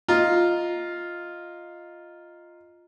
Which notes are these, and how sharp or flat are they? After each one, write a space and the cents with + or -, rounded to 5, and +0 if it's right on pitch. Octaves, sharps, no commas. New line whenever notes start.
F4 +0 D#5 +0 A#5 +0